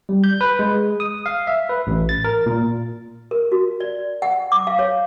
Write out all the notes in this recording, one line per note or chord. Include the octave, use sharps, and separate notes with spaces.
G3
G6
B4
G#3
D#6
F5
E5
B4
A1
A6
A#4
A#2
A#4
F#4
D5
F#5
D6
F5
C#5